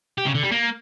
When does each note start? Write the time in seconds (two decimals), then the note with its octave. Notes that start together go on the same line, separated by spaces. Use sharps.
0.18 G4
0.26 C#3
0.35 D3
0.43 G3
0.51 A#3